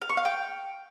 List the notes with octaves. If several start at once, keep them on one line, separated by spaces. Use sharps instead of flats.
F5
C#6
F5
G5